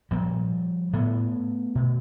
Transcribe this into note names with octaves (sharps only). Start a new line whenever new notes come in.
A#2 F3 G3
A2 A3 B3
B2